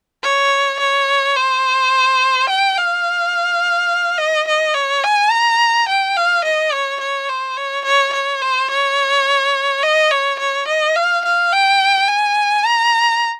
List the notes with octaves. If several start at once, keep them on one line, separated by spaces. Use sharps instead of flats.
C#5
C#5
C5
G5
F5
D#5
D#5
C#5
G#5
A#5
G5
F5
D#5
C#5
C#5
C5
C#5
C#5
C#5
C5
C#5
D#5
C#5
C#5
D#5
F5
F5
G5
G#5
A#5